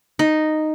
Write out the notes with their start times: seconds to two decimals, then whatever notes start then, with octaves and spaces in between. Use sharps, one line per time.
0.19 D#4